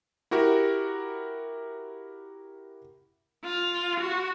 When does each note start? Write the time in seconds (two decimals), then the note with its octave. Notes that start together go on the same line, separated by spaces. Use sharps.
0.31 E4 F#4 G4 A#4
3.44 F4
4.00 F#4